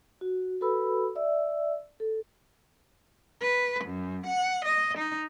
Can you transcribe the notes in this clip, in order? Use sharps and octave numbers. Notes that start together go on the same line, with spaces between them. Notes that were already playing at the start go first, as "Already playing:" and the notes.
F#4
F#4 A4 B4 B5 E6
D5 E5 E6
A4
B4
F#2
F#5
D#5
D#4